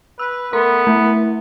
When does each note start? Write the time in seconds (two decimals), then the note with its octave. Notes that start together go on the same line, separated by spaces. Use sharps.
0.19 B4 E6
0.53 A3 B3 A#4 A#5 C6
0.87 A3 E4